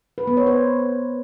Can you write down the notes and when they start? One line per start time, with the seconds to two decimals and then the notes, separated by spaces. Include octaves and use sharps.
0.18 B4
0.27 B3
0.37 C#5
0.47 C5